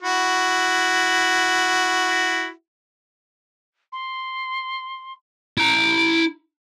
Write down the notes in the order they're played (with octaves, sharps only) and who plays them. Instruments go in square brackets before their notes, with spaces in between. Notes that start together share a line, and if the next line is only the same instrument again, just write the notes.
[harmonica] E4 F#4
[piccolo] C6
[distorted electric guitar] E4 A#5 [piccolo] D7